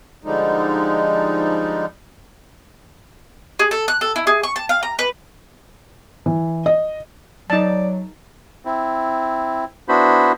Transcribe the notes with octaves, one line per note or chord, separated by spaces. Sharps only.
D3 F3 G3 G#3 D#4
G#4
A4
F#6
A4
E4
G#4
C#6
A5
F5
A#5
B4
E3
D#5
F#3 D#4 D5 A5
C4 E4
B3 D4 E4 F#4 C5 B5